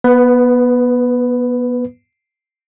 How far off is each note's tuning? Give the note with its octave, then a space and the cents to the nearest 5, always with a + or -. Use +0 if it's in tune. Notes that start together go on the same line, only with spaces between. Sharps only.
B3 -25 B4 +10